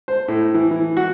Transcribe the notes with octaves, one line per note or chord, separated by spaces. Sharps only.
C5
A2
E3
E3
F#4